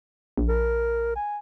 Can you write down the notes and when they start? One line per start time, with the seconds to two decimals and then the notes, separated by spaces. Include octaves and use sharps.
0.37 A#1
0.49 A#4
1.16 G#5